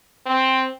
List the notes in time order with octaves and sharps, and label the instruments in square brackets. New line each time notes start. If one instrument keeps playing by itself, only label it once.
[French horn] C4